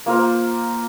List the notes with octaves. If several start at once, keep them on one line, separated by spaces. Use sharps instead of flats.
A#3 F4 A#4 C5